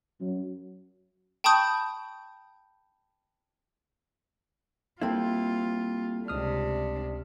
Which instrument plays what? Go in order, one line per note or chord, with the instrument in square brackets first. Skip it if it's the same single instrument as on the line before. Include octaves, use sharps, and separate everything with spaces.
[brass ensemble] F#2
[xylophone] G5 A5 B5 C#6 D#6 G6
[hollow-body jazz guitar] G3 C4 E4 [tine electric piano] A#3 A4 G5 [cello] F4
[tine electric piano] C#2 D#6 F6 [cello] C3 D4